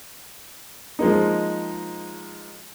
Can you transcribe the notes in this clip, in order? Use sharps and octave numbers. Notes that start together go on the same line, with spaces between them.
F3 G#3 A#3 D#4